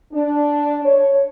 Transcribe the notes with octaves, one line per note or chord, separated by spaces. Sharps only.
D4
C#5